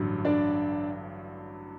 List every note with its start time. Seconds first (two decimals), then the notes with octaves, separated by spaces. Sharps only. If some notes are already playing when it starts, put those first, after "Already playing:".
Already playing: A1 G2 D3 F#3
0.25 D4 D5